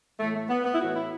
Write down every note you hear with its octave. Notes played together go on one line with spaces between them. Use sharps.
A2 E3 A3
A3
B3
B3
E4
A2 E3 F#4
E4